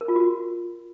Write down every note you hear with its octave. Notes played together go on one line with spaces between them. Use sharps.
A#4
F4
F#4